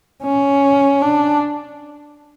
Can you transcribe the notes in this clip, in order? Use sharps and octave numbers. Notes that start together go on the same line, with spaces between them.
C#4
D4